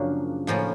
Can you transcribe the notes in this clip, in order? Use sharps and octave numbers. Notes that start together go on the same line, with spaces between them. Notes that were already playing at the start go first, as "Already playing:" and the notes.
Already playing: F#2 C#3 F3 A#3 D4
A2 F3 A#3 C#4